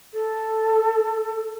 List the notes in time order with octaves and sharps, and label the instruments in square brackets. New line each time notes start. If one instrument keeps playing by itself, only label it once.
[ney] A4